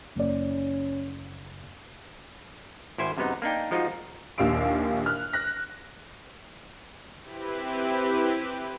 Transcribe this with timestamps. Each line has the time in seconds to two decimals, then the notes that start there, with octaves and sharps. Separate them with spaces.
0.16 F#1 C#4 D5
2.98 G#1 E4 C5 G#5
3.17 F#2 C3 G#3 B3 D#4
3.42 A#3 D4 D#4 G5
3.71 F3 G#3 D#4 F4 F#4
3.92 A#4
4.38 A#1 D#2 G4 F5 E6 D7
5.06 F6 F#6
5.33 F#6 A#6
7.21 C4 E4 G4 B4